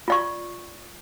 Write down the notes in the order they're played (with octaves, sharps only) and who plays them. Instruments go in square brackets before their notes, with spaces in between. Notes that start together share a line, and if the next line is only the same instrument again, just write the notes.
[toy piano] F4 D5 C#6